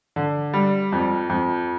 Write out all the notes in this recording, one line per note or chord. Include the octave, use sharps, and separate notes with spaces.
D3
G3
F2
F2